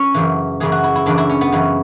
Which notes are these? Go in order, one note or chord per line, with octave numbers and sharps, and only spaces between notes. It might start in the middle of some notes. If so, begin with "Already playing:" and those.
Already playing: C#4
F#2 C#3 E3
F#2 C#3 E3 G#4
F#4
E4
E4
F#2 C#3 E3 D4
E4
C#4
B3
F#2 C#3 E3